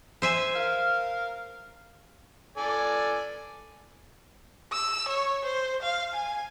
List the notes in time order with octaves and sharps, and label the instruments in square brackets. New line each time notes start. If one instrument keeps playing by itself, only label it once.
[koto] C5 E5 G#5
[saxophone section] A#4 F5
[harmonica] A4 D5 G#5
[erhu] E6
C#5
C5
F5
G#5